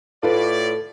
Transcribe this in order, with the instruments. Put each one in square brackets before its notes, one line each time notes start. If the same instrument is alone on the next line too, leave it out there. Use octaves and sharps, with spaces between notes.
[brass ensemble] A2 D5 [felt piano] F4 B4 [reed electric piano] A4